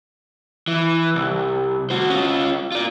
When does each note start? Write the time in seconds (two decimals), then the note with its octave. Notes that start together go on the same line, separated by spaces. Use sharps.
0.68 E3
1.15 C2
1.90 F#4 C5
2.10 C#4 F4
2.72 F4 D5